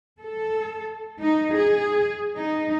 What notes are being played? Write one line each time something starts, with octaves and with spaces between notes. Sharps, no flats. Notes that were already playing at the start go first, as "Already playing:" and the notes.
A4
D#4
G#4
D#4